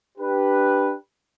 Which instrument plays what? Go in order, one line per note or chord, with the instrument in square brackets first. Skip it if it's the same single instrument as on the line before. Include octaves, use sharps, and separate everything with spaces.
[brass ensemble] D4 G4 B4